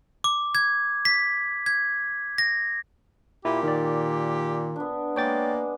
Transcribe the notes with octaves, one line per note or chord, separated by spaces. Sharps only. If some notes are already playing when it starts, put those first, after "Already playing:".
D6
G#6
B6
G#6
A#6
A#2 E4 G4
D#3 D5
B3 D4
G#3 A#3 C#5 D5 G5 A6